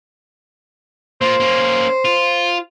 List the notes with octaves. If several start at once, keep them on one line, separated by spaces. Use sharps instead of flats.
A#3 F4 C5
A#3 C#4
F4